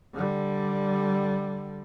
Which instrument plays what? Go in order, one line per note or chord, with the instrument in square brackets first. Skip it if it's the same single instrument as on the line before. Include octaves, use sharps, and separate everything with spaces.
[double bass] D3 G3